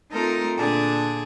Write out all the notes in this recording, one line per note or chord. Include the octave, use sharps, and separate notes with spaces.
A3 C4 D#4 F4 A4 A#4
A#2 D3 D4 G#4